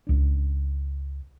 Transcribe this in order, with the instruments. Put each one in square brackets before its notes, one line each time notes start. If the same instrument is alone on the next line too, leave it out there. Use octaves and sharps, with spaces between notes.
[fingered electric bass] C#2 D4